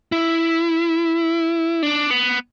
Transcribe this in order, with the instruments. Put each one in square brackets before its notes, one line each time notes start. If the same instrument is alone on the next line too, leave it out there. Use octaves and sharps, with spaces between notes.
[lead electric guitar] E4
D4
B3